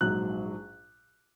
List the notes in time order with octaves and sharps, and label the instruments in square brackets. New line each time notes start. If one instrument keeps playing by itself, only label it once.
[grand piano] A#1 G#2 F#3 F#6